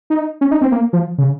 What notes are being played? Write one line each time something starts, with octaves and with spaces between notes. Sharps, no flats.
D#4
C#4
D#4
C4
A#3
F3
C#3